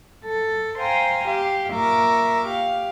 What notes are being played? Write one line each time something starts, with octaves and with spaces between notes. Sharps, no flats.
A4
C5 F5 G5 G#5 A#5 C6
G4 F5
A#2 A#4 E5 C#6 D6
G4 F5